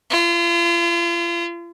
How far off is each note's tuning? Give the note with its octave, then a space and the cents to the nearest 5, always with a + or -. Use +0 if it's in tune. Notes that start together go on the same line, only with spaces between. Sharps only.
F4 -40